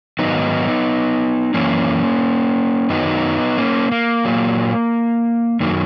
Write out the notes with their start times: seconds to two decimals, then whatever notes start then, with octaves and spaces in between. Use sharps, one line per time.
0.19 G#2 D#3 F#3 B3 D#4
1.54 F#2 E3 A#3 C#4
2.90 F#2 D#3 F#3 B3 D#4
3.58 A#3 C#4
3.92 A#3
4.25 A#2 F#3
5.60 F#2 D#3 F#3 A#3